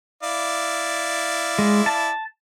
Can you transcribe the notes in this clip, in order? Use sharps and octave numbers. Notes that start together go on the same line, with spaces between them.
E4 D5 F5
G#3
A5